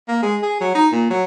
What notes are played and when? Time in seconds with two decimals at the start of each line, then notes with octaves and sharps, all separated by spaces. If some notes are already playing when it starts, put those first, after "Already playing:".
0.08 A#3
0.22 G#3
0.43 G#4
0.61 F#3
0.75 D#4
0.92 A#2
1.10 F#3